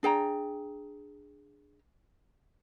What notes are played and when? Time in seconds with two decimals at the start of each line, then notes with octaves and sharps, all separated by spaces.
0.03 D4 G#4 G5 A#5